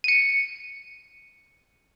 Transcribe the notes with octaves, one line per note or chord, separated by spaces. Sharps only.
C#7 D#7